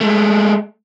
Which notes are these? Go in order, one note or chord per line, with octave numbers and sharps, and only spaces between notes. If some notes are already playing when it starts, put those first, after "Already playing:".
G#3 A3